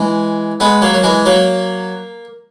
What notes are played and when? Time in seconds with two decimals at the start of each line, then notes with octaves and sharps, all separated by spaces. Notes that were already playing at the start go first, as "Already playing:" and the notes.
Already playing: E3 G#3
0.60 G#3 B3
0.82 F#3 A#3
0.93 F#3
1.03 E3 G#3
1.26 F#3 A#3